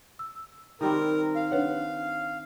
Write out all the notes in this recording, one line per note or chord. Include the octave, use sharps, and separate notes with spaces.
E6
D#3 G3 C4 A#4
F5
D4 B4 C#5 F#5